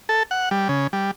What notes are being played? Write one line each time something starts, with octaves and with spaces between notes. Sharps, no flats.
A4
F#5
G3
C#3
G3